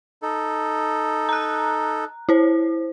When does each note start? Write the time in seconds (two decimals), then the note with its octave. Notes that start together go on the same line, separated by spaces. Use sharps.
0.22 D#4 A4
1.29 A#5 F#6
2.29 E4 C5